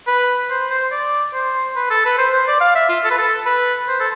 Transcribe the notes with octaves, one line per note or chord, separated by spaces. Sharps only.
B4
C5
C5
D5
C5
B4
A4
B4
C5
C5
D5
F5
E5
F4
A4
B4
A4
B4
C5
A4